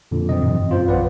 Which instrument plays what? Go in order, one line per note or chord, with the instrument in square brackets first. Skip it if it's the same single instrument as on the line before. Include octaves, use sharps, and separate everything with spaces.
[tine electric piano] F2 A#2 D3
[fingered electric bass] C3 D#3 F#3 [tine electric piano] C4 D#5
[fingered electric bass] G2 A#2 E3
[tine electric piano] F#2 F4 C5
[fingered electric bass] A#1 [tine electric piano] B4 D5 F#5